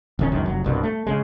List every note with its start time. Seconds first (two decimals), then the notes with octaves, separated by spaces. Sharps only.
0.19 D#1 D#3 C#4
0.32 C#2 F#2 D#3
0.45 F1 F#3
0.64 C2 G2 B2
0.83 A3
1.07 C#3 G#3